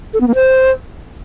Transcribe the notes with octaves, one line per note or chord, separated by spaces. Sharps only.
A4
B3
A#3
C5